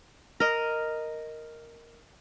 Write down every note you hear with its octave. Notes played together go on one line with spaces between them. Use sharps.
A#4 D#5